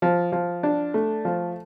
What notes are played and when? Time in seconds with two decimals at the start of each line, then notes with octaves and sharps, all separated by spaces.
0.02 F3
0.32 F3
0.63 D4
0.94 A3
1.25 F3